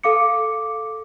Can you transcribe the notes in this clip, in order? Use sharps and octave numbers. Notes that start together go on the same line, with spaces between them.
A4 F5 D6 C#7